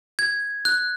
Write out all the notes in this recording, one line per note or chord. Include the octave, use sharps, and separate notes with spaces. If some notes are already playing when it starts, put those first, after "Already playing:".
G#6
F#6